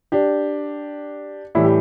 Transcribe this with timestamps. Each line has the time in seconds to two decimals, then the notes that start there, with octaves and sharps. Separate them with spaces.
0.12 D4 G4
1.55 A2 E3 G3 E4
1.64 G4